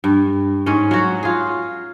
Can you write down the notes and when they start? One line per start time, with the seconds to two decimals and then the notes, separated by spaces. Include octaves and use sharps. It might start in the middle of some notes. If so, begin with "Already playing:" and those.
0.04 G2
0.66 G#2 C#4
0.91 F#3 F#4
1.23 F4 G#4